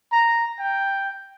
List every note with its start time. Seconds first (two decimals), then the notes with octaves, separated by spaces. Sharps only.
0.13 A#5
0.60 G5